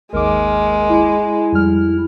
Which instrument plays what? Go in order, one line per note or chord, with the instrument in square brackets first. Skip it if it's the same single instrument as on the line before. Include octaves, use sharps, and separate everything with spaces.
[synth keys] G#1 D#2 D6 [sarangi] G#3 [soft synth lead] A#4
[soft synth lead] E4
[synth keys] F2 G3 F6